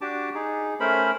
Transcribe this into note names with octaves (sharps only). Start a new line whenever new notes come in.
D4 F#4 G4 A5 D6
D#4 G#4
A3 C#4 A#4 C5 B5